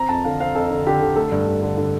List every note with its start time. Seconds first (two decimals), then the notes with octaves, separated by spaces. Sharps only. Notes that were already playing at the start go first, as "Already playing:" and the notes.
Already playing: C4 A#5
0.09 F2 A5
0.25 D3 F5
0.40 C4 F5
0.55 F2 A4
0.70 D3
0.86 D3 G4
1.02 D3
1.16 A3 A4
1.32 G2
1.47 G2
1.62 D3
1.77 D3